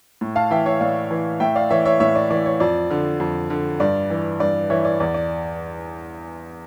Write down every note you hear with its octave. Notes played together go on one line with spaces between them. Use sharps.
A2
F5 A5
E3 E5 G5
C#5 E5
A2 D5 F5
E3
A2 E5 G5
D5 F5
E3 C#5 E5
C#5 E5
A2 C#5 E5
D5
E3 D5
C#5
F2 D5
D3
F2
D3
G2 D5
E3
G2 D5
E3 C#5 E5
D5
E2 D5
D5